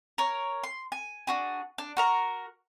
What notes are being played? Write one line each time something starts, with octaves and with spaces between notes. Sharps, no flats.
A#4 C#5
C6
G#5
D4 F#4 G#4
D4
F#4 A#4 A#5